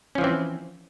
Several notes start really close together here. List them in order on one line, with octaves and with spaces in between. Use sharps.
C#4 F3 E3 C4